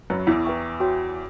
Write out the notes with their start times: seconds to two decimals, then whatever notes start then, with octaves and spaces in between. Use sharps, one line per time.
0.10 F#2 F#3 B4 E5 B5
0.27 E2 E3
0.45 E4 B4 E5 G5 C#6
0.80 F#4 C#5 G5